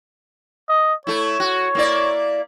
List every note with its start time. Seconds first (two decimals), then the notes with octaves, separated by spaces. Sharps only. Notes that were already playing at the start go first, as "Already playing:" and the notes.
0.69 D#5
1.07 A3 E4 C#5
1.40 F#4
1.75 A#3 E4 D5